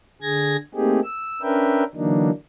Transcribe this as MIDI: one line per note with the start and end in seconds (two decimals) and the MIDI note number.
0.22 0.57 50
0.22 0.57 68
0.22 0.57 92
0.22 0.57 94
0.75 1.00 57
0.75 1.00 58
0.75 1.00 60
0.75 1.00 63
0.75 1.00 67
0.75 1.00 68
1.04 1.42 88
1.42 1.84 61
1.42 1.84 62
1.42 1.84 70
1.42 1.84 71
1.42 1.84 76
1.42 1.84 79
1.95 2.30 50
1.95 2.30 52
1.95 2.30 54
1.95 2.30 58
1.95 2.30 62
1.95 2.30 63